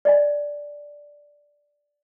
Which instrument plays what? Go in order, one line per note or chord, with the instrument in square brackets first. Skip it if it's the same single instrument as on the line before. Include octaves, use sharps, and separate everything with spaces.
[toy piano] D5 D#5 G#5